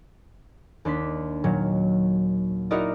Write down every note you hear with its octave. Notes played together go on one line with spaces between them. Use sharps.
D#2 D4 C6 B6
A#2 D#3 F#3
D#4 E4 F#4 A#4 D5 D#5